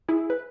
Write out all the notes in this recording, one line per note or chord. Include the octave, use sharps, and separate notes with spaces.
E4 G#4
B4